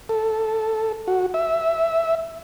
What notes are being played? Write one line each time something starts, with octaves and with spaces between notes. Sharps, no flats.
A4
F#4
E5